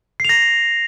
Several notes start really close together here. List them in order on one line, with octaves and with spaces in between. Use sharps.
C7 F7 A#6